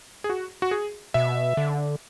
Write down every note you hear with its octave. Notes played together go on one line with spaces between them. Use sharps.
G#4
F#4
F#4
G#4
B2 E5
D3